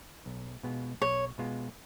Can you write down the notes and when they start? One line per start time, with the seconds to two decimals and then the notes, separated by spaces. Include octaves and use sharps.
0.26 B1
0.63 B2 G#3 B3 F4
1.01 B1 C#5
1.38 B2 G#3 B3 F4